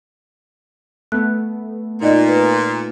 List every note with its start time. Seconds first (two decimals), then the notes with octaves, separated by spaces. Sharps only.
1.12 A3 B3 F#6
2.01 A#2 D#4 D5 D#5
2.28 B4